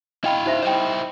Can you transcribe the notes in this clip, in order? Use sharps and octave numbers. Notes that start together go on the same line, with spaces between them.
E4 D#5 F5 G5 B5
D#4 C5 E5
E4 C5 D#5 G5